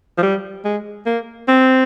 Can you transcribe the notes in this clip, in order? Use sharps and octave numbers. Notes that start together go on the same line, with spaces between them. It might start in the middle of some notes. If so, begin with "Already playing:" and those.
F3
G3
G#3
A#3
C4